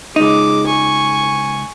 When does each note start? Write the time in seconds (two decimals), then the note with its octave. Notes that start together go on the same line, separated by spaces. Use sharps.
0.16 C#2 G#3 D#4 D6
0.66 G#5 C#6